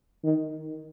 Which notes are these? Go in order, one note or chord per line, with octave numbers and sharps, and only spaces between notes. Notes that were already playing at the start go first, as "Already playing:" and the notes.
D#3